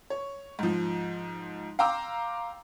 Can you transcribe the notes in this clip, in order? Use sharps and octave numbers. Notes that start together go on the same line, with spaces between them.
C#5
G#2 F3
F5 G5 A#5 C6 D6 E6